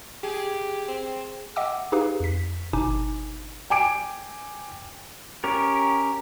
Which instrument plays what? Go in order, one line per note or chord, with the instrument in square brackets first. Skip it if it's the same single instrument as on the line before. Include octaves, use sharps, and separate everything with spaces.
[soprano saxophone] G4 [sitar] G#4
[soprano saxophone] C4
[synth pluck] D#5 E5 F#5 G5 D6 E6
D#4 G4 G#4 B4 F5
F2 B6
G1 B2 D4 D#4 G#5 D6
[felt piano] G5 G#5 D6 D7
[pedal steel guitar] C#4 G4 A#4